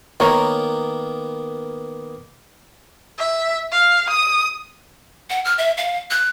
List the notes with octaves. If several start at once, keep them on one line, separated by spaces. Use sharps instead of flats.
D#3 A#3 B3 A#4 C#5 A#5
E5
F5
D#6
F#5
F6
E5
F5
F#6